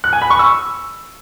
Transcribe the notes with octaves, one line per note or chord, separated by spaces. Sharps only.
F#6
G#5
B5
C#6
E6